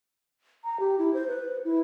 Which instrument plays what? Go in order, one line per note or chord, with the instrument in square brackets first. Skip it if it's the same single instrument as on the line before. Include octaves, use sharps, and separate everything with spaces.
[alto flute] A#5
G4
E4
C5
B4
E4